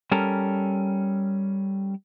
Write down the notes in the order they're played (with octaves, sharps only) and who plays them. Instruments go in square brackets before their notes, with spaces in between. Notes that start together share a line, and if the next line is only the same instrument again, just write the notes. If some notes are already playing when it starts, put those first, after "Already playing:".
[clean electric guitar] G3 C#4 A4 A#4